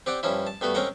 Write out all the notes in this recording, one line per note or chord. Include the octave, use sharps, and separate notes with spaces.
C4 G4 D5 F#5
G2 F3 C#4 E4
A5
G2 A3 B3 F#4
G#3 C4 C#4 A#4 F#5